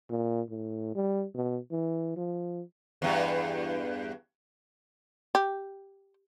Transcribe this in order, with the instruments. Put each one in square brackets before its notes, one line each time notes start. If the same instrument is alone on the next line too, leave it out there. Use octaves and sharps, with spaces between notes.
[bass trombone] A#2
A2
G3
B2
E3
F3
[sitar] E2 G2
[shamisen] G4